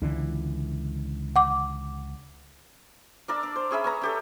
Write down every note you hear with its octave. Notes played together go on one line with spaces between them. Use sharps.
C#2 D3 E3
F#5 D6
D4 A#4 D5 E6
D4
C5
C#4 G#4 E5 B5
C#4 B4 A#5
C#4 G4 A4